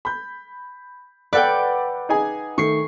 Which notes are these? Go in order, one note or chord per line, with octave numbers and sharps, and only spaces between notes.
B5 G6
A4 B4 D5 F#5 G5 D6
D#4 G#4 G#5
D#3 A3 C#6 C7